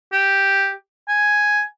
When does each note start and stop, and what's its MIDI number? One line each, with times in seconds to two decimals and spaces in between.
0.12 0.73 67
1.08 1.62 80